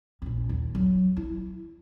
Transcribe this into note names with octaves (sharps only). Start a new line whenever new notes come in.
A#1 C#4
D#2
F#3
E4